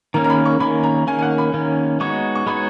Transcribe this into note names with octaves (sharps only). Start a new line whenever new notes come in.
D#3 A#3 C#4 A#5
A#5
B5
C#6
D#3 A#3 C#4 B5
A#5
D#3 A#3 C#4 G#5
G#5
F#5
B5
D#3 A#3 C#4
G#3 B3 D#4 F#4 C#5 C#6
C#6
G#3 B3 D#4 F#4 C#5 B5